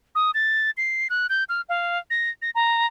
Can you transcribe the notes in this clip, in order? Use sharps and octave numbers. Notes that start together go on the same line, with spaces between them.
D#6
A6
C7
F#6
G6
F6
F5
A#6
A#6
A#5